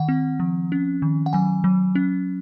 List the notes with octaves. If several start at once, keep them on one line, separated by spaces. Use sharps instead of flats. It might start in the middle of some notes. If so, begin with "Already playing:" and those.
Already playing: D#3 F#5
C4
F3
C#4
D#3
F#5
F#3 G#5
F#3
C#4